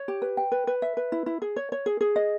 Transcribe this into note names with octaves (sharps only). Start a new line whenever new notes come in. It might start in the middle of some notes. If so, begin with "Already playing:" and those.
Already playing: C#5
G4
B4
G5
B4
B4
E5
B4
E4
E4
G#4
C#5
C#5
G#4
G#4
D#5